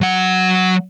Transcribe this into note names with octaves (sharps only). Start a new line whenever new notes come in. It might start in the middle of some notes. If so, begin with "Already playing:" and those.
F#3 F#5